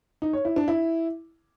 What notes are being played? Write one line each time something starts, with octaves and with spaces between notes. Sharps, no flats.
D#4
C#5
E4
D4
E4